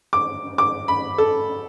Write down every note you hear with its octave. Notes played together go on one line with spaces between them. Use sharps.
D6
D6
B5
A4